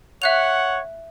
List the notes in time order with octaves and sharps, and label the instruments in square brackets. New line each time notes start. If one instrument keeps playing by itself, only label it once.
[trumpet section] C#5 F#5 [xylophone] E5 F#6 F7